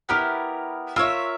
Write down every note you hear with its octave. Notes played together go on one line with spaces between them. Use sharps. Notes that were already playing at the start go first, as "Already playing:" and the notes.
B3 E4 G4 A#4 F6
F4 A#4 C#5 E5 E6